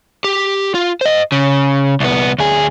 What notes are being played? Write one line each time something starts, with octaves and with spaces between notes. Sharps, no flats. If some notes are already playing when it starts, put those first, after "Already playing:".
G4
F4
C5 D#5
C#3
C2 B3
D2 G#4